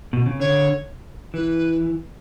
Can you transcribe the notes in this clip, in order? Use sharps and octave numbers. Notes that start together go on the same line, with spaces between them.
B2
C#3
D3 C#5
E3 B4